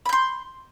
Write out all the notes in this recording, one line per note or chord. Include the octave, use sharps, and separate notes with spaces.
B5 C6 G6